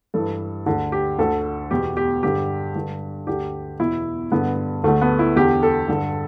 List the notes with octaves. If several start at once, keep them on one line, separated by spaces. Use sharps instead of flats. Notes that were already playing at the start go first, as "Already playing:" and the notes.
G2 E3 A4
D2 D3
G4
D2 D3 A4
E2 B2 G4
G4
G2 D3 G4
G2 D3
D2 D3 G4
E2 B2 E4
G2 D3 B3
D2 D3 A3
B3
E4
E2 D3 G4
A4
G2 D3